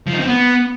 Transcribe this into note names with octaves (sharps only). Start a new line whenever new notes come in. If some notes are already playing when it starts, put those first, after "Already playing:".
F3
D#4
C4
B3